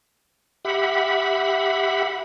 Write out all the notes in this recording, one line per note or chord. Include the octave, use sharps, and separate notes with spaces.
G4 E5 F#5 B5